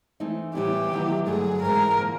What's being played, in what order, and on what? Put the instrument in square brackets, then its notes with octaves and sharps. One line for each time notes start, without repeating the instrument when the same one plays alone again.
[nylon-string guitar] E3 A3 C4 D#4
[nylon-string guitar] A2 E3 G3 B3 E4 [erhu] G4
[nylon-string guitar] C3 D#3 F#3 B3 E4
[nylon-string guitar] G2 D3 F#3 A3 [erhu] G#4
[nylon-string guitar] G#2 E3 G#3 C4 [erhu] A#4
[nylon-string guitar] D3 F3 A#3